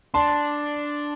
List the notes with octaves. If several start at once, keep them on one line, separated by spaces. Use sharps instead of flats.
D4 A5 C6